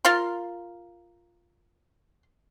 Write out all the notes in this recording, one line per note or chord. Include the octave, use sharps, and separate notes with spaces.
F4 A#4 F5 C6